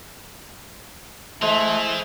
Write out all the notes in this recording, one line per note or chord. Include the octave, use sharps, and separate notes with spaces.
E3 G#3 A3 C5